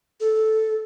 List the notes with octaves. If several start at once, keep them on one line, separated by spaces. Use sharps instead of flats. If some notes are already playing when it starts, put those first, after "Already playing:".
A4